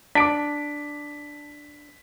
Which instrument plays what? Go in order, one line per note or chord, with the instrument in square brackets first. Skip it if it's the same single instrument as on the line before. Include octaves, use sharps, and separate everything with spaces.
[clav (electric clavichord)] D4 [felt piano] A5 D6 [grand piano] B6 D7